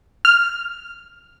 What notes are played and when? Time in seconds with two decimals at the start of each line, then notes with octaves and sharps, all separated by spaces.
0.25 F6